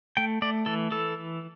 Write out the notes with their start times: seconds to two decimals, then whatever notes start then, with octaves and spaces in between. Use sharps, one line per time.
0.17 A3 G5
0.42 A3 D5
0.66 E3 A4
0.91 E3 A4